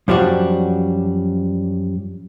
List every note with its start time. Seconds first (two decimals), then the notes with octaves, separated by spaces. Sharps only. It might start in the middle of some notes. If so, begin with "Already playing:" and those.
0.08 F#2 F3 G3 D4 F#4